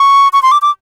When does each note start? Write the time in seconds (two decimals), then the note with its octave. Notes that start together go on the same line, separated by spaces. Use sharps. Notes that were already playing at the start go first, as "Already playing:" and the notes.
Already playing: C#6
0.33 C#6
0.43 C6
0.52 D6
0.62 D6